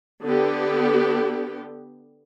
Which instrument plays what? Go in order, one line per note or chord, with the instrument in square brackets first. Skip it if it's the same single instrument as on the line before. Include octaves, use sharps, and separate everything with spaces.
[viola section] D3 B3 G4